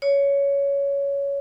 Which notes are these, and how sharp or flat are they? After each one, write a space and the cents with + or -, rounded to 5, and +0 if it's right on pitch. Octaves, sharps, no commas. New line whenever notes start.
C#5 +15